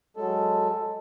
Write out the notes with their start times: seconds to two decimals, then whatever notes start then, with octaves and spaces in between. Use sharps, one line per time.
0.17 F#3 G#3 A4